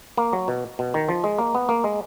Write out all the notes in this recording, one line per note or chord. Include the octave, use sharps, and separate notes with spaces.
A#3
F#3
B2
B2
D#3
F3
G#3
A#3
B3
A#3
G#3